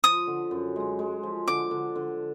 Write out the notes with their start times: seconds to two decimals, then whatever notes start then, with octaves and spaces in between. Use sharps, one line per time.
0.04 F3 D#6
0.27 D3
0.51 F#2
0.76 G#3
0.99 G#3
1.23 F3
1.48 D3 D6
1.71 D3
1.96 D3